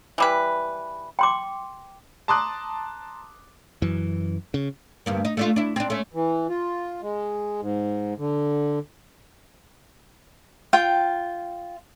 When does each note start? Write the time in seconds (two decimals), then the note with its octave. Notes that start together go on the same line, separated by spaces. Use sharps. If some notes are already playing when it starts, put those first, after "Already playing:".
0.18 E3 G3 B4
1.19 G5 C6 D6
2.28 A5 A#5 C6 D6 D#6 F#6
3.82 F#2 E3
4.54 C#3
5.06 D2 G2 A#3
5.25 D#4
5.37 A3 D4 F4
5.56 D4 E4
5.76 C4 D4
5.90 A3 C#4
6.14 E3
6.49 F4
7.01 G#3
7.61 G#2
8.18 D3
10.73 F4 G5